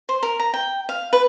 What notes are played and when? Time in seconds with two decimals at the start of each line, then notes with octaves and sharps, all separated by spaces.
0.09 C5
0.23 A#4
0.40 A#5
0.54 G5
0.89 F5
1.13 B4